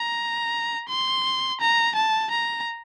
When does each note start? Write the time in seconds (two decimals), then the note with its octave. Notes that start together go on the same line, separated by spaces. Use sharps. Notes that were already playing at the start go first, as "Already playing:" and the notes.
Already playing: A#5
0.89 C6
1.61 A#5
1.95 A5
2.31 A#5